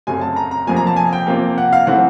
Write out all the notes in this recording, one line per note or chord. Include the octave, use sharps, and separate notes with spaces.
F#2 C#3 F#3 A3 C4 G#5
A5
A#5
A#5
F2 C3 F3 A#3 G#5
A#5
A5
G#5
G5
C3 F3 A#3
F#5
F5
C#3 E3 A3 C4 F#5